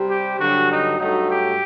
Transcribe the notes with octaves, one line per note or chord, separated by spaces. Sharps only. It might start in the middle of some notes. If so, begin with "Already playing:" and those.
Already playing: C3 G3
G4
G2 D3 F#3 F#4
D#4
G2 F#3 A3 D#4
G4